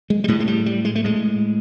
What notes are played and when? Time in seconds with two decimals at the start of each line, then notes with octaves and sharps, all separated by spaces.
0.10 G#3
0.24 G3
0.28 A2 G#3
0.40 G#3
0.47 G3
0.66 G3
0.85 G#3
0.95 A3
1.04 A2 G#3